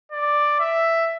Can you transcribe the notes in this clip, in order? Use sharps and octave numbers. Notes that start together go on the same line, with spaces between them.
D5
E5